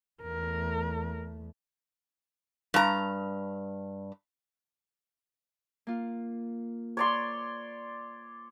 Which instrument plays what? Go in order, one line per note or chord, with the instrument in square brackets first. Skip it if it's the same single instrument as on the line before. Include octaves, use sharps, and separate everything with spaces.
[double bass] E2 A3 [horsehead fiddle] A#4
[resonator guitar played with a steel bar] G2 A#5
[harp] A#3 F4
[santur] C#5 D5 C6